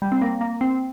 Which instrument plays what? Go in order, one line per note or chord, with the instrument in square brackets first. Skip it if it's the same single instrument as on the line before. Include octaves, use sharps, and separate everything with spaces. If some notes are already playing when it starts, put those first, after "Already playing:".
[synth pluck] G3
C4
A#3
A#3
C4